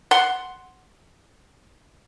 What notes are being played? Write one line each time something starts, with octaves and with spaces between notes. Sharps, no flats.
F#5 C6